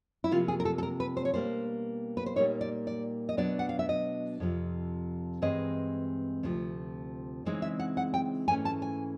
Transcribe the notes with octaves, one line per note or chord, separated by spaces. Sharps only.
E4
C3 F3 A#3 F4
G#4
A#4
A4
A4
A#4
B4
C5
C#5
B2 G3 A#3 D4 C5
B4
C5
A#2 G3 A#3 D#4 C#5
D5
D5
D#5
B2 F#3 B3 D4 D5
F#5
F5
E5
D#5
F2 C3 F3
G2 E3 G#3 C4 D#5
D2 C3 F3
C#3 E3 G#3 C4 D#4
E5
F#5
F#5
G5
G#2 E3 A3 C#4 G#5
A5
G#5